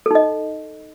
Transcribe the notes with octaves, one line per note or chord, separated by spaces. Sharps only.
D#4 A4 D#5